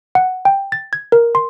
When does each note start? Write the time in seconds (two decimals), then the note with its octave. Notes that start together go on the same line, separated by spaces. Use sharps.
0.15 F#5
0.45 G5
0.72 A6
0.93 G#6
1.12 A#4
1.35 C6